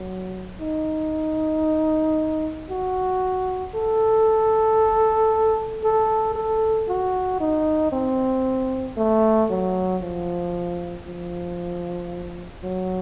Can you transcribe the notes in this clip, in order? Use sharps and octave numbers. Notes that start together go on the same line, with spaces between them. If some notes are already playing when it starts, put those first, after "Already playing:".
Already playing: F#3
D#4
F#4
A4
A4
A4
F#4
D#4
C4
A3
F#3
F3
F3
F#3